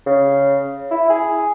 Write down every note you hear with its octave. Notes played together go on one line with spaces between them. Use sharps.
C#3
E4
G#4